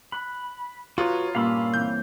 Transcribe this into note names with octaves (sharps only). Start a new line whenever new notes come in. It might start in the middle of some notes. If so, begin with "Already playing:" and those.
B5 F#6
F4 F#4 B4 C#5 A#5 D#6
G2 A#2 C#4 F5 B5 E6
E3 C4 G6